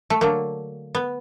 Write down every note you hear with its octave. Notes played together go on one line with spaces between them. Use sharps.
A3
D3 F#3 A3 A#3
B3